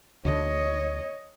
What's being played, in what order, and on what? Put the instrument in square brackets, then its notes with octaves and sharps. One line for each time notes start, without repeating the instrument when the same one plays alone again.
[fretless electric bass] D2 D3 [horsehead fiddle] C#5 D#5